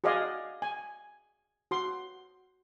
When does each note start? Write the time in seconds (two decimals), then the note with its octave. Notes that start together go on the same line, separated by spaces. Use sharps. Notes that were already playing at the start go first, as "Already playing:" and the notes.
0.04 F#4 G#4 D5 D#5 F5 G#5
0.62 G#5
1.71 F#4 C6